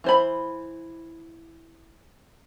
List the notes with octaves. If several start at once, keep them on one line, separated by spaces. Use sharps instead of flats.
E3 C5 B5